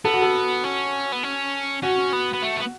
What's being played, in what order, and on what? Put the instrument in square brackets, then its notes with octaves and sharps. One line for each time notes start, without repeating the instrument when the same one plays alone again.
[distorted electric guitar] B3 [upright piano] A4
[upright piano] F#4
A4
[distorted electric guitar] C#4
B3
C#4
[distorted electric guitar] C#4 [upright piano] F#4
[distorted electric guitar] B3
B3
A3
B3